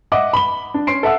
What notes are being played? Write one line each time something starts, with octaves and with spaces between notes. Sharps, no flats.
D#5 E5 F#5 D6
B5 G7
D4
C#4 C6 C7 D7
A4 E5 F#5 E6